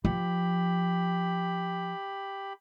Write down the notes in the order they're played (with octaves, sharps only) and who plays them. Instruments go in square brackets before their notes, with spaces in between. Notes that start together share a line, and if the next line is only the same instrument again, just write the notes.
[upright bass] F3 [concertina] G4 B5